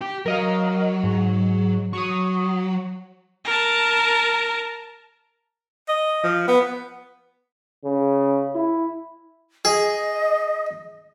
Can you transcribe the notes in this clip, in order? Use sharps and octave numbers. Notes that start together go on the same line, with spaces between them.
G4
F#3 A#4 D#5 F5
G#2
F#3 C#6 D#6
A#4 A5
D#5
F3
B3
C#3
E4
G#4 D#5